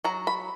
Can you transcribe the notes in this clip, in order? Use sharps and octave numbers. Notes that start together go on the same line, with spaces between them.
F#3 A#5
B5